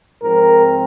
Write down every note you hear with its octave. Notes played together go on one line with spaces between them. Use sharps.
G#2 F3 C4 A#4